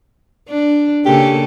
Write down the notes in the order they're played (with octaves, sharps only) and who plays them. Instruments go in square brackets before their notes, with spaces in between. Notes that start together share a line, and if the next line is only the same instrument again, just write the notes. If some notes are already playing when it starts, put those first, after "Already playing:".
[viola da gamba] D4
[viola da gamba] C#3 A#3 A4 [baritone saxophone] G4